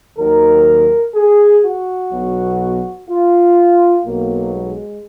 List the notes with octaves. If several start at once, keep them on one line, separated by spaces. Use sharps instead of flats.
D#2 D#3 F#3 A#4
G#4
F#4
B1 B2 F#3
F4
B1 B2 F#3 A#3
G#3